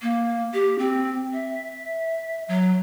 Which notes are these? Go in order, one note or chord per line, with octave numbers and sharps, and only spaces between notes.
A#3
G4
C4
E5
F#3